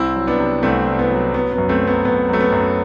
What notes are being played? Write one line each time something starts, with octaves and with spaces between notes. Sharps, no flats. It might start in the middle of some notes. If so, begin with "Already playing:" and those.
Already playing: C2 C4 E4
F#3
B3 D4
C3
C2 A3 C4
C2
B3
F#3
F#3 B3
B3
F#2
A3 C4
F#3
B3
F#2 B3
F#3 A3
B3
F#2